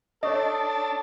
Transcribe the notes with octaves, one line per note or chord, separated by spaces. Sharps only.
D4 A4 C#5 D#5 A5 C#6 D#6